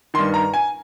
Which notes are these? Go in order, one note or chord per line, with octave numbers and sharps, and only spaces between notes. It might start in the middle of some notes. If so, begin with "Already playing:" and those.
G2 D#3 C6
A#5
G#5